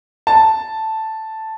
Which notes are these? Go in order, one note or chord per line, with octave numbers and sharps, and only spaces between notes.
A5